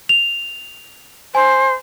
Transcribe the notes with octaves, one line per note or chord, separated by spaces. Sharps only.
F7
C5 G#5